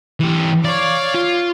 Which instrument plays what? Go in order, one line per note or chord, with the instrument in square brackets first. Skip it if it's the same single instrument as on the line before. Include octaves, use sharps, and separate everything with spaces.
[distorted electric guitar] E3 G4
[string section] C#5 F5 D6 [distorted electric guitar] D5
[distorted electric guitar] F4